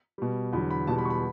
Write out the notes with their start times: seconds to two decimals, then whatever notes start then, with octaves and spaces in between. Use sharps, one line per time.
0.18 B2 G3
0.53 E2 D3 F#3 B5
0.70 B5
0.87 E2 B2 G3 A5
0.98 B5
1.05 C#6
1.10 B5